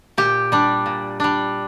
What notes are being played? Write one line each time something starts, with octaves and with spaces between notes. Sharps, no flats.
A#2 G4
G3 D4
A#2
G3 D4